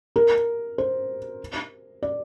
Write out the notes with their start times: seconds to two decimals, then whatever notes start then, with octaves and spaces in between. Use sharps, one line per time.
0.16 A#4
0.78 C5
2.03 D5